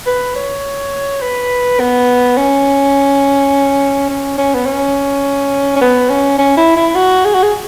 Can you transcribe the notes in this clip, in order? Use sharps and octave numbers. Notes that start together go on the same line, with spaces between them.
B4
C#5
B4
B3
C#4
C#4
C#4
B3
C#4
C#4
B3
C#4
C#4
E4
E4
F#4
G#4
F#4
G#4